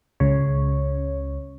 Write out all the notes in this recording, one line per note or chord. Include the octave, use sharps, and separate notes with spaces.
C#2 C#3 C#5